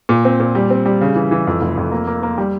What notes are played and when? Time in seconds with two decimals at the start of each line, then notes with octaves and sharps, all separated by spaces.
0.09 A#2
0.25 C4
0.40 A#2
0.55 G3
0.70 C4
0.86 G3
1.01 C#3
1.16 E3
1.31 E3
1.47 F2
1.62 F1
1.77 F2
1.92 A#3
2.07 A#3
2.23 A#3
2.38 G3